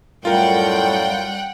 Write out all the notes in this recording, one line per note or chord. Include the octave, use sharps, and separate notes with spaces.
F#2 A2 G3 F4 A#4 F#5 G5